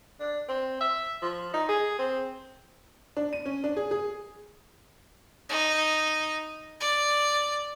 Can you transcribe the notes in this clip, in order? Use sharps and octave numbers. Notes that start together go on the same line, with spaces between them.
D4
C4
E5
F3
D#4
G#4
C4
D4
D#7
C#4
D4
G#4
G#4
D#4
D5